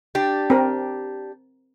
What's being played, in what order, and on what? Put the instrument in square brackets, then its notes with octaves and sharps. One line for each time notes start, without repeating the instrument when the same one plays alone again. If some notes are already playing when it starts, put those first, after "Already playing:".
[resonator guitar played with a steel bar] D4 G4
[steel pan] C4 A#4